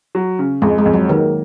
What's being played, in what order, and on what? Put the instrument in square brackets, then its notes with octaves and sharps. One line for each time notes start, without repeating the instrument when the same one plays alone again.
[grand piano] F#3
C#3
[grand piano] F2 [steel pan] G#3
[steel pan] G#3
[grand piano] F2
[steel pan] F#3
[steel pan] D#3 [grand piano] A#3